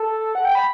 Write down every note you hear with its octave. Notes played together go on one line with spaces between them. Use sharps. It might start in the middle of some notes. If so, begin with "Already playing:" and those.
Already playing: A4
F#5
G5
B5